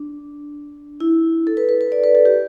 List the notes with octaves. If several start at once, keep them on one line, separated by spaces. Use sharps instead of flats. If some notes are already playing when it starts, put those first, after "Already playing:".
Already playing: D4
E4
A4
B4
B4
B4
D5
B4
A4
G4